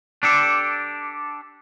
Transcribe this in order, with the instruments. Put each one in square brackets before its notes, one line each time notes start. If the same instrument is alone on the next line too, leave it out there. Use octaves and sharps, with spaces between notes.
[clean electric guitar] D4 G4 A4